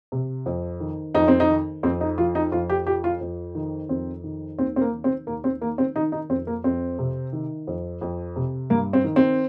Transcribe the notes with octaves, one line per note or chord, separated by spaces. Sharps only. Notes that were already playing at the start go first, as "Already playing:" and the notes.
C3
F2
D#3
F2 D#4
C4
D#4
D#3
F2 C4
D#4
F3 F4
D#4
F2 F4
G4
F3 G4
F4
F2
D#3
F2 C4
D#3
D#2 C4
C4
A#3
D#3
C4
D#2 A#3
C4
D#3 A#3
C4
D#3 D#4
D#4
F2 C4
A#3
F2 C4
C3
D#3
F2
F2
C3
G2 A#3
C4
D#3
C4